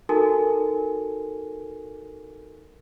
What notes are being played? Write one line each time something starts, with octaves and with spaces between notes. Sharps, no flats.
D#4 F#4 A4 A#4 G#5